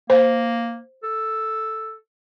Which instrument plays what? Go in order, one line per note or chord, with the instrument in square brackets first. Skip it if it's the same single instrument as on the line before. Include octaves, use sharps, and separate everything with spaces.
[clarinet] A#3 [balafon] C5
[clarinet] A4